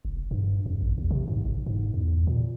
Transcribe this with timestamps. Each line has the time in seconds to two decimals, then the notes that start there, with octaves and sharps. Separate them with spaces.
0.05 F1
0.31 G2
0.66 F2
0.81 A1
0.98 D#2
1.11 C3
1.28 G#2
1.45 G1
1.66 G#2
1.94 E2
2.27 A#2